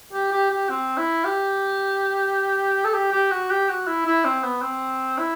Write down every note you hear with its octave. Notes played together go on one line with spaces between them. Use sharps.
G4
G4
G4
C4
E4
G4
A4
G4
G4
F#4
G4
F#4
E4
E4
C4
B3
C4
E4